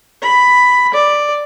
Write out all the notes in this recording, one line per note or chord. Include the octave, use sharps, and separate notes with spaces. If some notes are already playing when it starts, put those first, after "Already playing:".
B5
D5